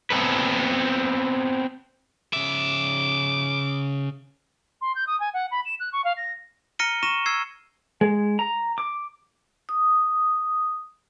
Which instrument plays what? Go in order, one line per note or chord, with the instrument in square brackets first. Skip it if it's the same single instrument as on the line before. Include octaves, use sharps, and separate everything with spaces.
[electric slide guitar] B3 C4 A4 B4
[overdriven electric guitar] C#3 E5 [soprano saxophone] D6
[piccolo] C6
G6
D#6
G#5
F#5
B5
E7
F#6
C#6
F5
A#6
[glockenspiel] A#5 F6 A#6 C#7 D#7 G7
C#6 A#6 D#7 E7 G7
E6 G#6 C7
[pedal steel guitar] G#3
A#5
D6
[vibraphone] D#6